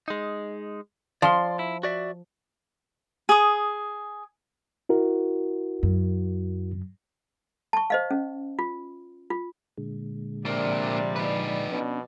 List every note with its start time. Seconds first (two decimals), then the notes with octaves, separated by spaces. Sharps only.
0.08 G#3 D#4
1.22 F3 D5 C6
1.59 E4
1.83 F#4 D5 E5
3.29 G#4 D#6
4.89 E4 F#4 A#4
5.83 F#2
7.73 A5 C#6
7.90 C5 D#5 F5
8.11 C#4
8.59 F4
9.30 F4
9.78 A#2 D3 G#3
10.46 C3 F3 G3 A#3 D4 D5
11.16 D#4 B4
11.72 B2 B3 C#4 D4